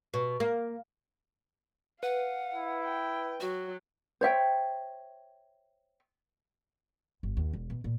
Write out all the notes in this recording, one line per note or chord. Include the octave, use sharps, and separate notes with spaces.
B2
A#3
B4 F5 F#5
E4
G5
F#3 F#4
C5 C#5 E5 G5
G1
D#2
E1
B2
A#2